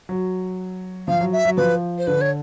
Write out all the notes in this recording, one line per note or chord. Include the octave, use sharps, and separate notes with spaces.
F#3
F3 F5
F#3
E5
F#3
F3 B4
C5
D3 B4
C#5